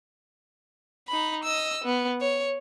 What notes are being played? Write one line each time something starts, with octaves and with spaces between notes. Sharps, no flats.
D#4 B5
D#5 E6
B3
C#5